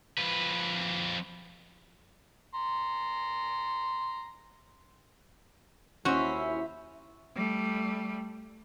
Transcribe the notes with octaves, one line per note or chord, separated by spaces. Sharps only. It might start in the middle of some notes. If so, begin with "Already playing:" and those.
F2 B4
A#5 C6
D#2 C#4 E4 F#4 C5 E5
G3 A3